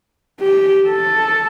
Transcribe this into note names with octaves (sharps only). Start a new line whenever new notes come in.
G4
A4